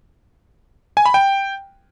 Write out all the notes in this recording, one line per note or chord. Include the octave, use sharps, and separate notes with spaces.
G#5
B5
G5